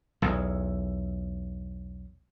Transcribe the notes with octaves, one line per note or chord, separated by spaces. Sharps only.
B1 E2